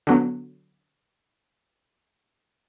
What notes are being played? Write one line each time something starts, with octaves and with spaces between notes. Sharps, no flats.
D3 F#3 B3